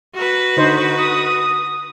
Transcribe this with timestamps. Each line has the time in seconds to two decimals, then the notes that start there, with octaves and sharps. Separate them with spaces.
0.15 F#4 B4
0.57 D3 D#4 C5
0.98 D#6